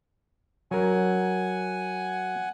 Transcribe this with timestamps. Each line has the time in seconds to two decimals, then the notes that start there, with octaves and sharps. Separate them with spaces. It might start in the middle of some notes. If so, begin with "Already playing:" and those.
0.71 F#3 A#4 F#5 G#5